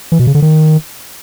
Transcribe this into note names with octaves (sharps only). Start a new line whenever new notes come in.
E3
B2
C#3
D3
D#3